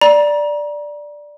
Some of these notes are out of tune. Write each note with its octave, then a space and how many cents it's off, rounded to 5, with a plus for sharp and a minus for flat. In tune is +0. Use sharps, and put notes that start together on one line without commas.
D5 +0 A#5 +35